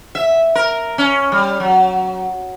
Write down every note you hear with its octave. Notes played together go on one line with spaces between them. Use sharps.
E5
A#4
C#4
G3
F#3